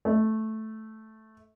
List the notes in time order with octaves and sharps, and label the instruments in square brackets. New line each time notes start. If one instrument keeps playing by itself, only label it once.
[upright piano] A3